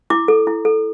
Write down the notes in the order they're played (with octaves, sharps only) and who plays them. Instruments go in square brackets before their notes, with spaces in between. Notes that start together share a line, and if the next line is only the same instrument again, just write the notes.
[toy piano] E4 D6
A4
E4
A4